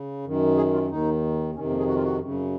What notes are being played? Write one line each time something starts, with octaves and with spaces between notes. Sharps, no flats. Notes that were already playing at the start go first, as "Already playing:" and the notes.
Already playing: C#3
F#2 D#3
G#4
F4
D#2 D#3 D#4
F2 C3 D#3 C#4
A#3
G#4
F#4
F4
F#4
F#2 C#3